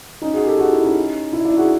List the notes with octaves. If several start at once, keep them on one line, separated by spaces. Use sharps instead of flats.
C#4 D#4
F#4 G#4
G4 A4
F#4 G#4
E4
C#4 D#4
D4 E4
D4 E4
F#4 G#4